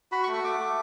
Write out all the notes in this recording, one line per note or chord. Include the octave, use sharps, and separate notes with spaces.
F#4 B5
C#6
A3
C#6
A3 D6
A3